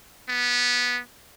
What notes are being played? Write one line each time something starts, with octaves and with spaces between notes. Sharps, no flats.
B3